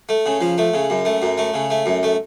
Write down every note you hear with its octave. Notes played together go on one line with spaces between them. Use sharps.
A3
C#3
F3
A3
C#3
F#2
A3
F#2
A3
C#3
A3
F#2
A3